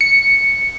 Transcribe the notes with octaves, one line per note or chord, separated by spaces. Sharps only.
C#7